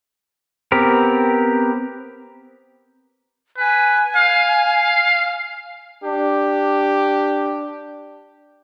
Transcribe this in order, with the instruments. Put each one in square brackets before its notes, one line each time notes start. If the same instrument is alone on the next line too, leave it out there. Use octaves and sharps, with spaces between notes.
[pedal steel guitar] B3 C4 G4 A#4
[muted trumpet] B4 [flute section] G#5
[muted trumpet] F5
[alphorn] D4 [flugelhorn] G4